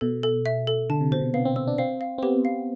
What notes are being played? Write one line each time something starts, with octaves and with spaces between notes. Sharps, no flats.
B2 A4
A4
E5
A4
D3 A5
C3
B2 C5
C3
B3 F5
C4
C4 E6
D4
C4 F5
F5
C4
B3 G4
F5